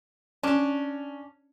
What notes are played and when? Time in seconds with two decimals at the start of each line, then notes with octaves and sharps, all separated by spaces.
0.43 C#4 D4